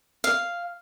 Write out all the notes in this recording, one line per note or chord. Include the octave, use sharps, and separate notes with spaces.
F5